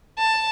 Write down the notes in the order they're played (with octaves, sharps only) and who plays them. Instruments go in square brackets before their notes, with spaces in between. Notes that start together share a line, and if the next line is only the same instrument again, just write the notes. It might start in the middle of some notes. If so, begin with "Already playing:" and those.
[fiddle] A5